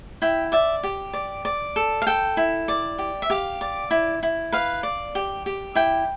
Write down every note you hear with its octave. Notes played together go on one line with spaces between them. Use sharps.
E4 G5
D5 E5
G4
D5
D5
A4
F5
A4 G5
E4
D5
G4
E5
G4 F5
D5
E4
E4
B4 F5
D5
G4
G4
E4 G5